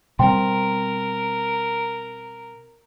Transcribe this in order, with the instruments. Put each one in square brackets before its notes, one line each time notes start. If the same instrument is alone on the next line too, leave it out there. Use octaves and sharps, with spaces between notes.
[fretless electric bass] B2 G3 C4 [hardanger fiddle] A#4 [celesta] C5 G5 C6